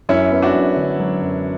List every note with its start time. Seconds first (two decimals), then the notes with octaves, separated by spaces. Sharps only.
0.09 F#2 C#4 E4
0.31 B3
0.42 D4 F#4
0.55 F#2
0.76 D3
1.00 F#3
1.22 F#2